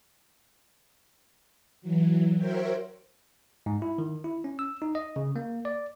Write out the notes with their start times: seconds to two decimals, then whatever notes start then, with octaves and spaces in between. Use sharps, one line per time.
1.82 E3 F#3
2.37 F#4 A#4 C5 C#5 E5 G5
3.66 G#2
3.82 E4
3.98 D#3
4.24 E4
4.44 C#4
4.59 E6
4.82 D#4
4.95 D#5
5.16 C#3
5.36 A#3
5.65 D5